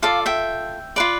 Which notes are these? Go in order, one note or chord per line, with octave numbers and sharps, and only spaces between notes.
F4 A4 D5 F5
E5 G5
F4 B4 D5